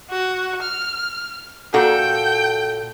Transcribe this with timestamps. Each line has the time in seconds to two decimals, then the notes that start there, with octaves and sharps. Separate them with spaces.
0.10 F#4
0.62 F6
1.74 A#2 F#4 A4 G5